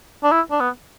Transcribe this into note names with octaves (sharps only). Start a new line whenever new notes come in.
D4
E4
D4
B3